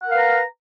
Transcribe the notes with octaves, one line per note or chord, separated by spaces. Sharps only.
A#4 B4 F5 F#5 A#5